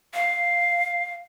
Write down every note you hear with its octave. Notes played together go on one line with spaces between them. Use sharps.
F5